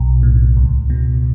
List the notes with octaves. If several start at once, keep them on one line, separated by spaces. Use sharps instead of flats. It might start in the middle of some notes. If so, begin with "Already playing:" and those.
Already playing: B1
A2
C#2
B2